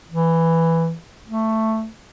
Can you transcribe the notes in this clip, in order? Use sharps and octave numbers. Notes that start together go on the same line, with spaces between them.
E3
A3